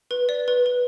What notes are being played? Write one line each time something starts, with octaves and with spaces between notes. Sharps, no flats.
B4
D5
B4
B4